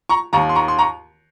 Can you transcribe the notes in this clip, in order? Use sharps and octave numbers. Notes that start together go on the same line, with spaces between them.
A#5 C#6
D#2 D#3 A#5 C#6
C6
A#5 C#6
C6
A#5 C#6